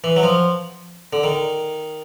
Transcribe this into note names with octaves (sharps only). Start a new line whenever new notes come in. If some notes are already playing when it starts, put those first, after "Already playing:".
E3
F#3
F3
D3
D#3